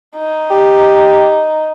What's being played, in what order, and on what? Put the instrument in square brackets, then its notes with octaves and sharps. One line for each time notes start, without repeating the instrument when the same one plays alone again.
[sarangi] D#4
[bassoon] G4